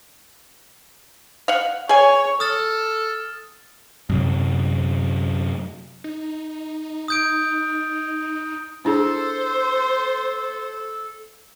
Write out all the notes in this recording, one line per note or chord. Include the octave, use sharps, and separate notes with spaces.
F5 F#5
G#4 C#5 G#5
A4 D#6 F6 A6
F#2 C3 F#3
D#4
D#6 G6 D7
D4 E4 G#4 A4 C5